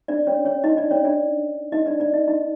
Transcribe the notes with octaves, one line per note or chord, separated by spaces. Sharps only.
D4 D5
C#4 C#5
C#4 C#5
D#4 D#5
D4 D5
C#4 C#5
D4 D5
D#4 D#5
D4 D5
D4 D5
D#4 D#5
D#4 D#5